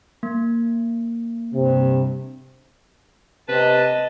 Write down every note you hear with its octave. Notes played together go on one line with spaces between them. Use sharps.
A#3
G2 C3
C3 B4 D#5 A5